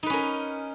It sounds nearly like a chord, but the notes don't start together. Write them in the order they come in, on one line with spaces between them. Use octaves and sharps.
D#4 B4 C#4 A#4